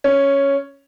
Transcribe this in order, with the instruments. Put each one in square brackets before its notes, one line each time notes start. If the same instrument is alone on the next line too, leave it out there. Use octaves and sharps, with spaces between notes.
[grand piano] C#4